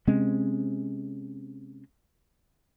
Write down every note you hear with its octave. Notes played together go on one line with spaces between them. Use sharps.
C3 G#3 C4 C#4